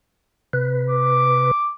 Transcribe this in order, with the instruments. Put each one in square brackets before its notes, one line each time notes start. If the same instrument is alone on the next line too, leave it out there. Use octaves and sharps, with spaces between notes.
[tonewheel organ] C3 B4
[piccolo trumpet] D6